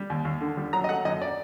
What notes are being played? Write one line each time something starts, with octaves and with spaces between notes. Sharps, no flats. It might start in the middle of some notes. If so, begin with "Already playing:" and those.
Already playing: G3
D#2
D#2
D3
G3
F#3 A#5
D#5
A3 F#5
F#2 D#5
D5